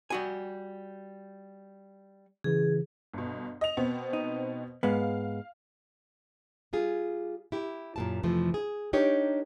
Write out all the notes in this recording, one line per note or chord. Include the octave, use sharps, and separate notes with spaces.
G3 F#4 G#5
C#3 E3 G#4
G1 B2
D#5 F7
B2 B3 C4
D#4
G#2 G#3 B3 F5
G3 F4 G#4
E4 G4
F#2 A#2 A5
F2 C3 E3 F3 A3
G#4
D4 D#4 G4 A#4 C#5